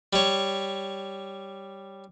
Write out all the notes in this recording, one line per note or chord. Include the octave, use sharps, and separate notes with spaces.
G3 C#5